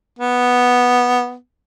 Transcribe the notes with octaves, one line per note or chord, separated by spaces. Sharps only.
B3